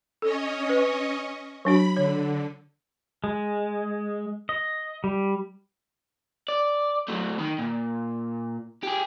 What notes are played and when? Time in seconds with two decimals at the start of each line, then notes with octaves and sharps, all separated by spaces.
0.22 C#4 A4 C#5 D#5
0.69 B4
1.65 F#3 D4 F#4 B5
1.97 D3 C#5
3.24 G#3
4.49 D#5
5.04 G3
6.48 D5
7.09 F#3 A3
7.39 D#3
7.59 A#2
8.83 G4 G#4